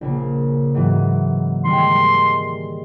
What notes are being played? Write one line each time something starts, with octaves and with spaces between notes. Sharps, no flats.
A#1 C#3 A#3
G#2 E3 F#3
D#3 G3 G#3 C6